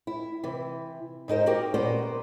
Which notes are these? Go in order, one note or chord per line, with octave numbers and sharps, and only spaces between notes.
E4
C3 E3
G#2 D#4 A#4 C5
A#3 F#4 G4 A#4
A#2 A#3 B3 C#4 C5 D5